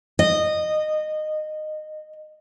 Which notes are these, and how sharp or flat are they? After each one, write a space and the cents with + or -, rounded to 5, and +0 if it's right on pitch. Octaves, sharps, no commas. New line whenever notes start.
D#5 -20